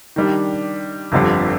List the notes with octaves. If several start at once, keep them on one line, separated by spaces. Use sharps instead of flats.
D#3 G3 D4
G1 F2 D3 G3